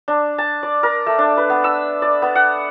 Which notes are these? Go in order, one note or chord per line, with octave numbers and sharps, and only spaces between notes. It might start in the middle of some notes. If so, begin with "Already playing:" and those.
D4
A5
D5
A#4
A3
D4
B4
B3
E6
D5
B3
F#5